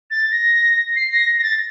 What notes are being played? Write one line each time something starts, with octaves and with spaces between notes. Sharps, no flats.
A6
A#6
C7
A#6
A#6
A6